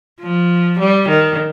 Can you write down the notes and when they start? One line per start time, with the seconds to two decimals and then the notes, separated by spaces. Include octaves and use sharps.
0.20 F3
0.80 G3
1.09 D#3